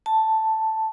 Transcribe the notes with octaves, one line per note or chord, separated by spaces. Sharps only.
A5